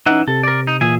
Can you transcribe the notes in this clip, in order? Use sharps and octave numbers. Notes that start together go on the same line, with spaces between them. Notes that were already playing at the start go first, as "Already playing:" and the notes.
E3 C#4 D#4 E5 F#5
C3 A4
A#4 D5
D#4
A#2 E3 G#4 E5 G#5